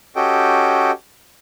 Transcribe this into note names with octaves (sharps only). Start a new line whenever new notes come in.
C#4 F#4 G4 A4 D#5 G5